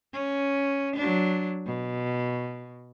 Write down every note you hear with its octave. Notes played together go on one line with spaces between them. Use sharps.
C#4
F#3 D4
B2